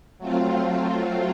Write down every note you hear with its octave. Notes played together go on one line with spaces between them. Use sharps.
F#3 A3 C4 F4